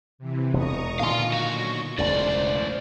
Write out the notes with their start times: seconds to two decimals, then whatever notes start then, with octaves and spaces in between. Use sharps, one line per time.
0.18 C3 E3
0.54 E1 A#5 C#6 D#6
1.00 A#2 D3 D#3 F5 C6 C#6
1.32 B1 F#4
1.98 E1 C#2 F#2 A2 C5 D5